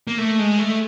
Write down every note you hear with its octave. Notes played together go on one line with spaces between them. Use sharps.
A#3
A3
G#3
A3